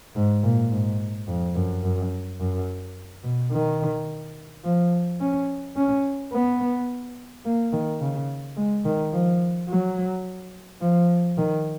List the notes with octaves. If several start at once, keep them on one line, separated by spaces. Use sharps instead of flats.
G#2
A#2
G#2
F2
F#2
F#2
F#2
B2
D#3
F3
C#4
C#4
B3
A#3
D#3
C#3
G#3
D#3
F3
F#3
F3
D#3